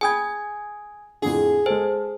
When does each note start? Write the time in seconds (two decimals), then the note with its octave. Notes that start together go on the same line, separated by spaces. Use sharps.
0.01 G#4 G5 G#5 B5 D#6 G#6
1.22 F2 A2 D3 G#4
1.66 G#3 A4 C5